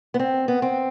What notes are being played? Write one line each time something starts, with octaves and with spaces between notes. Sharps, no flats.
B3
C4
B3
C4